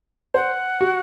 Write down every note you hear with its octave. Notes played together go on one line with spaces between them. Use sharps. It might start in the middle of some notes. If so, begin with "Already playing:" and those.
C5 F#5
F#4